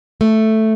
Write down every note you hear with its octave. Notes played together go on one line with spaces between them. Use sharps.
A3